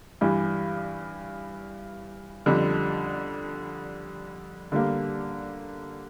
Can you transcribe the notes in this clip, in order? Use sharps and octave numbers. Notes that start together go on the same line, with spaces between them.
G2 E3 G3
F2 D3 G3
D3 G3 A#3